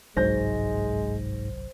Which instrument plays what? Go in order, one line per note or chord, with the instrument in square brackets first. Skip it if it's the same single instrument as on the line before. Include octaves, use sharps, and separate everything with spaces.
[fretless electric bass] G1 C2 F#3 [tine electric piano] G#2 A#6 [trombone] G#3 [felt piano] C5 G6